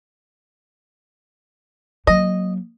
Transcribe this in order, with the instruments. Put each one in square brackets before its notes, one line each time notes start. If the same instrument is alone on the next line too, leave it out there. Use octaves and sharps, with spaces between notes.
[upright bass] F#3 A#3 [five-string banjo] D#5